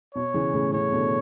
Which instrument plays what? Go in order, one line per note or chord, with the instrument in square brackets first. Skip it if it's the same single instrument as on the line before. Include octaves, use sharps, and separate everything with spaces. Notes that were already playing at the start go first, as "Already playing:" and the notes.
[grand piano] B2 [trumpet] C#5
[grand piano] C#3 E3
A2 C#3
[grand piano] A2 C#3 [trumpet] C#5
[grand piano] B2 D3